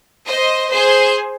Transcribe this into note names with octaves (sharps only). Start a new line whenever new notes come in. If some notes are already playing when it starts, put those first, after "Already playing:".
C5 D#5
G#4 C5